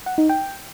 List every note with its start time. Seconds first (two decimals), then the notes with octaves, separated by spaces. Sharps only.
0.06 F#5
0.18 D#4
0.29 G5